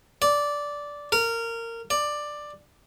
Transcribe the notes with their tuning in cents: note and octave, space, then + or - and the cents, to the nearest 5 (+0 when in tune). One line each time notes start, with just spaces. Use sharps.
D5 -10
A#4 -20
D5 +10